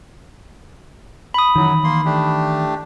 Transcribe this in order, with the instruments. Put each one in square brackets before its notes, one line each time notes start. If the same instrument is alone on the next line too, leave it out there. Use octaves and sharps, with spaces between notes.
[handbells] B5 D#6
[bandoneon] F#2 F#3 [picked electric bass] D#3 E3
[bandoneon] A#3 C6
A3 D4 G4